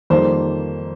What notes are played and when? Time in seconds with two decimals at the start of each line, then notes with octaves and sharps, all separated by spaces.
0.10 F2 D#3 G3 A#3 C5